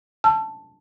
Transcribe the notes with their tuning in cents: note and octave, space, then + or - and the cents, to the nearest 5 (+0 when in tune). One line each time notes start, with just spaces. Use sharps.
A5 +0 E6 +40